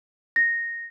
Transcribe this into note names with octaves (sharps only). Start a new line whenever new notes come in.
A#6